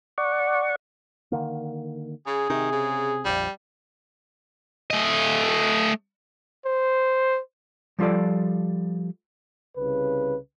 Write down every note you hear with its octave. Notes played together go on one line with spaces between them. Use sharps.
D5 F#5 C#6
D3 D#3 A#3
C#3 G#4
C3 D#3
C#3
A#1 F2 G3
A3 D#5
C5
F3 G3 F4 A4 D5
C2 C#3 B4